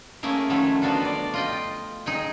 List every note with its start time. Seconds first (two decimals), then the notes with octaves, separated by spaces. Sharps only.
0.23 A3 A#3 C#4 E4 G#4 A#4
0.50 D#3 F3 F#3 A3 C#4 E4
0.82 F3 B3 D4 F4 F#4
1.05 D5
1.34 F4 D#5 G5
2.06 D#4 G#4 G5